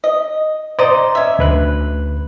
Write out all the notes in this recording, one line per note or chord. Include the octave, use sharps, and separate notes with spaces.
D#5
C5 D5 D#5 A#5
C#4 E5
D2 B4 F#6